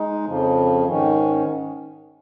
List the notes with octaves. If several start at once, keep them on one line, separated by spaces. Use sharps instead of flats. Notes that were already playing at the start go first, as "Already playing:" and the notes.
Already playing: G#3 D#4
F2 C#3 F3
G#2 D#3 C#4